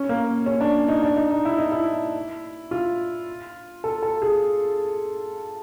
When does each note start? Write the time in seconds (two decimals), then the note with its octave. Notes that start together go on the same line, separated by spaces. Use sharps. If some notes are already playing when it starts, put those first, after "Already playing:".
Already playing: C#4
0.09 A#3
0.46 C#4
0.61 D4
0.88 D#4
1.03 D4
1.17 D#4
1.31 D#4
1.45 E4
1.58 D#4
1.72 E4
2.71 F4
3.84 A4
4.02 A4
4.22 G#4